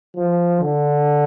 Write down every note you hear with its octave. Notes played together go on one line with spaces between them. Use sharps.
F3
D3